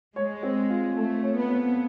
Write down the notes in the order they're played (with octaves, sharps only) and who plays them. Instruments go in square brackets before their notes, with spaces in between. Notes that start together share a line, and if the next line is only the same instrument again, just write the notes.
[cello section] G#3 [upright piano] C#5
[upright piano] C4
F4
[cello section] A3 [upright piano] A4
[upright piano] C#5
[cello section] B3
[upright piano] C4